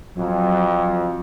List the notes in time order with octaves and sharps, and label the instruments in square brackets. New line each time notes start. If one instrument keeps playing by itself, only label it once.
[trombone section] F2 [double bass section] F#3